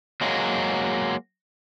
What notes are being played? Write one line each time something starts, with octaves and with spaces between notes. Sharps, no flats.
F#3 G#3 A#3